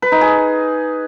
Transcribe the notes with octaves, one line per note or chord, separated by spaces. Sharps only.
B4
D#4
G#4